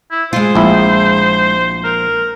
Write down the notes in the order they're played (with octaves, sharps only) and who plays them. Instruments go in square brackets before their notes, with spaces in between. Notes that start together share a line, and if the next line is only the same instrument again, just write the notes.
[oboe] E4
[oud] G#3 F4 [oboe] C5
[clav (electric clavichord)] A#1 E4
[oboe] A#4